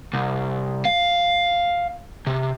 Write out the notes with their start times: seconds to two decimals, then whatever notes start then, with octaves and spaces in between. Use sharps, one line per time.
0.13 C2
0.85 F5
2.27 C3